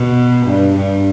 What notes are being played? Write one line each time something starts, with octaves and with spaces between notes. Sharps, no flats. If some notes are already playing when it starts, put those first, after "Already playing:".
Already playing: B2
G2
G2